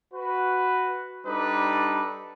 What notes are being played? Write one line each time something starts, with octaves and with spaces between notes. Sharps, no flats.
F#4 B4
G3 D4 D#4 A4 B4 D6